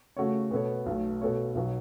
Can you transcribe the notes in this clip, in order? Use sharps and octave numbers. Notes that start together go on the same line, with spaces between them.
C#3 A3 F#4 A4 C#5
B2 B3 A4 C#5
B1 B2 A3
B2 B3 A4 C#5
B1 B2 F#3